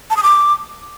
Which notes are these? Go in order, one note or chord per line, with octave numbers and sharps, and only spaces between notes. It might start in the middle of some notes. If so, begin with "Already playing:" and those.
A5
D#6
D6